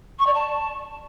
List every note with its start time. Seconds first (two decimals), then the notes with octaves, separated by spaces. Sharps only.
0.18 C#6
0.26 D5
0.34 A5